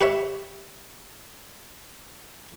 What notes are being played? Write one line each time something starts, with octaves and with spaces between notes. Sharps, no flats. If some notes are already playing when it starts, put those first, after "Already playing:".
G4 B4 C#5 E5